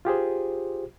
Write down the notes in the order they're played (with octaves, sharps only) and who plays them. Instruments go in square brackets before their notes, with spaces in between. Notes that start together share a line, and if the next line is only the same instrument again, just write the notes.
[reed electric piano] F4 G4 G#4 C5